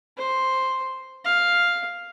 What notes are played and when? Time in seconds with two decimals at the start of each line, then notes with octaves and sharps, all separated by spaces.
0.18 C5
1.25 F5